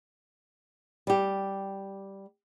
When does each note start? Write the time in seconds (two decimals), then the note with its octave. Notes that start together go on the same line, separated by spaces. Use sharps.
1.07 G3 G4